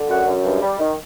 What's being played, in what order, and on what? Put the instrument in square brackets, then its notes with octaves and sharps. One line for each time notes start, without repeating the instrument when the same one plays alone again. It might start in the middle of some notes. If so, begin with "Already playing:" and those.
Already playing: [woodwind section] D3
F#2 F#4
F#2
G2
G3
D#3